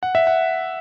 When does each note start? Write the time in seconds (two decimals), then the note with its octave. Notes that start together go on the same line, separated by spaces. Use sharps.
0.03 F#5
0.15 E5
0.27 F#5